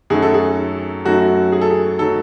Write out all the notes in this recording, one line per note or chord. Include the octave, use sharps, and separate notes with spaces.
F#2 D#3 F#3 A3 G#4
A4
G#4
F#2 D#3 F#3 A3 F#4
G#4
A4
G#4
D#3 F#3 A3 A4